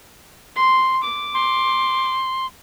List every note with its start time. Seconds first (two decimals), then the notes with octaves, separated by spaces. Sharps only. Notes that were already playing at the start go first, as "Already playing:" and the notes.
0.56 C6
1.03 D6
1.34 C6